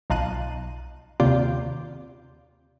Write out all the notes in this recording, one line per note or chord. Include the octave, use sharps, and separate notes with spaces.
B1 D#4 F4 A5 F#6 D#7
D#2 C3 F4 D5 D6 G6